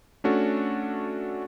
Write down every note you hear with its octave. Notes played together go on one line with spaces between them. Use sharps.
A3 C#4 D4 F#4 A4